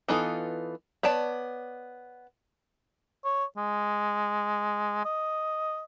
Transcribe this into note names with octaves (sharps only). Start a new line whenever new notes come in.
E3 B3 D#4 F4 A4
B3 C#5 D5 A5
C#5
G#3
D#5